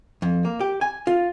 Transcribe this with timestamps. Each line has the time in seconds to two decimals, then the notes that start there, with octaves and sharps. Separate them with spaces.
0.22 F2
0.45 A#3
0.61 G4
0.81 G#5
1.07 F4